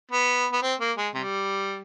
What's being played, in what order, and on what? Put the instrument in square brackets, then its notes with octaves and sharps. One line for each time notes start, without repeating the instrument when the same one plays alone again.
[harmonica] B3
B3
C4
A#3
G#3
C3 G3